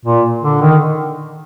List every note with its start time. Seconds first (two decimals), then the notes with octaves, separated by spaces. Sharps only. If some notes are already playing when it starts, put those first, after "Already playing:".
0.05 A#2
0.42 D3
0.61 D#3